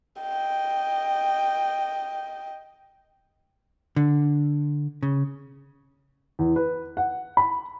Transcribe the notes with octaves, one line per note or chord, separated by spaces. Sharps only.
D#5 G5
D3
C#3
E2
B4
F#5
B5